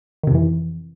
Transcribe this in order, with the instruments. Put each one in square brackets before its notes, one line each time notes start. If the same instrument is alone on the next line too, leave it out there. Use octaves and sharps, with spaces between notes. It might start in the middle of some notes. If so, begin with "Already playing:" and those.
[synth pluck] D#3
C3
F2
E3